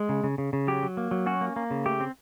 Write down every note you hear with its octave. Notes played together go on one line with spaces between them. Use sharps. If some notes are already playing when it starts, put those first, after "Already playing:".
Already playing: G#3
C#3
C#3
C#3
C#3
F#3 G4
F#3
A#3
F#3
C#4 F#4
A#3
A#3
C#3
A3 G4
C4